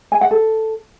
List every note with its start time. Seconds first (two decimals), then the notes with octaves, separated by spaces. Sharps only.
0.12 G#5
0.21 F#5
0.31 A4